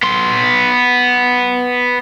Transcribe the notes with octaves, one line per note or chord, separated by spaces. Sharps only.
B3 C6